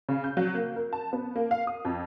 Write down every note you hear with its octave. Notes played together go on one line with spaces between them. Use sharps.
C#3
G6
F#3
A#3
A#4
A5
B3
A#3
F5
D#6
F2